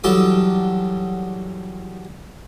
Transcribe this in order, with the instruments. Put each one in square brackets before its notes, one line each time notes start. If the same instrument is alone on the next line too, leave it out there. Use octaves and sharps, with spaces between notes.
[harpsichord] E2 F#3 G3 A4 D5 D#6